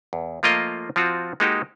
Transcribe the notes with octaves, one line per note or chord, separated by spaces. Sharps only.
E2
F3 A3 A#3 F4 A#4 D#5
F3 C4 F4 F#4
G#3 A#3 D#4 F#4 G4